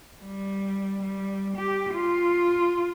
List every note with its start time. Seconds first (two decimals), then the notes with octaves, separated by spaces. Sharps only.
0.22 G3
1.03 G3
1.57 G4
1.94 F4